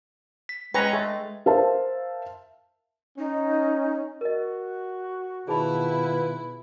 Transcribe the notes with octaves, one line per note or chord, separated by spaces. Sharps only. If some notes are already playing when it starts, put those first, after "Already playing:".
B6
G#3 C#4 B4 G5 A#5 G#6
A3 A4
A#4 C5 E5 F5 A5
C#4 D#4
F#4 A#4 D#5
B2 D#3 E4 F4 G#4 B4 A5 B5